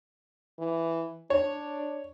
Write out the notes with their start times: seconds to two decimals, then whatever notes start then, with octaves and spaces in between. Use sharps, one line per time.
0.59 E3
1.30 D4 C#5